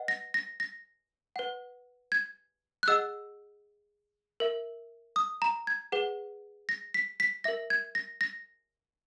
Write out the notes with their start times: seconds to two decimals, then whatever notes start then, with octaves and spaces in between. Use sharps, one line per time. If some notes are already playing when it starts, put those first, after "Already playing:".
Already playing: B4 D#5 F#5
0.08 A#6
0.34 A#6
0.60 A#6
1.36 B4 F#5
2.12 G#6
2.83 F#6
2.88 G#4 D#5 F#5 E6
4.40 A#4 E5
5.16 D#6
5.42 A#5
5.67 G#6
5.92 G#4 B4 F#5
6.69 A#6
6.94 B6
7.20 B6
7.44 A#4 E5 A#6
7.70 G#6
7.95 A#6
8.21 A#6